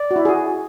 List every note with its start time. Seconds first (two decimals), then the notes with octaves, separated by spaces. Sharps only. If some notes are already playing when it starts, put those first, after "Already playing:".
Already playing: D5
0.11 F#4
0.16 E4
0.25 G#4
0.29 F#4